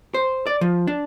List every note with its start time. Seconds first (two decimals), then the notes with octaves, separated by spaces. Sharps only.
0.14 C5
0.47 D5
0.61 F3
0.87 D4